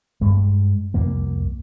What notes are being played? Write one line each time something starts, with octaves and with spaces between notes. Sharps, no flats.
G2 G#3
C2 F2 G3 A#3